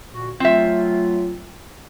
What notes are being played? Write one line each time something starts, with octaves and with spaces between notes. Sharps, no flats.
A#2 D3 F#4
F#3 A3 C4 F4 E5